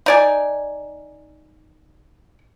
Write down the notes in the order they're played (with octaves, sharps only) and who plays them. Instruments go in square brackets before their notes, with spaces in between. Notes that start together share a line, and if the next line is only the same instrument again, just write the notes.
[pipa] D#4 D5 G#5